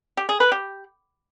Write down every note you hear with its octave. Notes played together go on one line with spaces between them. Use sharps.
G4
G#4
B4
G4